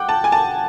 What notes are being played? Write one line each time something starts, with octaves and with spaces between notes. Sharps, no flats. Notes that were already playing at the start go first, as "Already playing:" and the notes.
Already playing: F#5 G5 D6
A5
G#5
A5